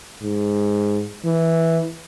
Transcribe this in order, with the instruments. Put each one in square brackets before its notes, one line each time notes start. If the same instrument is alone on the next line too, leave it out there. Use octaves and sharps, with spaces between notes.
[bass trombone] G#2
E3